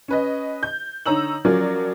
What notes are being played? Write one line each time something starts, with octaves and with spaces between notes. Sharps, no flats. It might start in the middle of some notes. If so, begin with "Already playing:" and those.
C#4 B4 D#5
G6
D3 D#4 C#5 A#5 E6 F#7
F3 F#3 C#4 A#4 D5